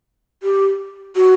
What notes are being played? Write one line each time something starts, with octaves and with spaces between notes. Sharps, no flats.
G4
F#4